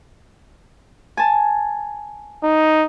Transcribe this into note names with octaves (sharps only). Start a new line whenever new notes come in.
G#5 A5
D#4